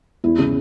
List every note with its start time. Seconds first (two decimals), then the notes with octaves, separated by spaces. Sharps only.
0.24 E2 E4
0.38 C#3